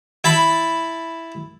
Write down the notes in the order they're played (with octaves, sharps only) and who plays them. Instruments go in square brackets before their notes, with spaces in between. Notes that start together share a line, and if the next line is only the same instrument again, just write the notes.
[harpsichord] E4 A5 B5